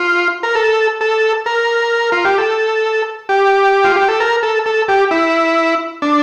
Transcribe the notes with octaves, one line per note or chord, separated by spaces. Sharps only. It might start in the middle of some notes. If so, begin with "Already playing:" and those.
Already playing: F4
A#4
A4
A4
A#4
F4
G4
A4
G4
F4
G4
A4
A#4
A4
A4
G4
E4
D4